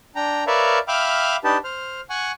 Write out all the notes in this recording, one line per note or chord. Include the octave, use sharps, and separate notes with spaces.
D4 G5 A#5
A#4 B4 C#5 D5 E5 F5
E5 F5 G5 B5 D6 F6
D4 D#4 G4 B4 A5
C5 F6
F#5 G#5 C#6